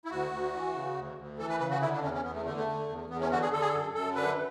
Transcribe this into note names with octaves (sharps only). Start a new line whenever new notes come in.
E4
D2 F#4
D2
E3
C#3
D2
D2
E3 A4
B4
C#3 B4
F#4
D3 E4
D4
E2 C#4
C#4
E2 B3
A3
D3 A3
A3
D3
E2
E2 B3
C#4
D3 F#4
G#4
D3 A4
G#4
A4
F#2
F#2 A4
D3 B4